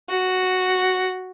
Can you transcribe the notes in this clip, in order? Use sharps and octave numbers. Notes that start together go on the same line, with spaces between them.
F#4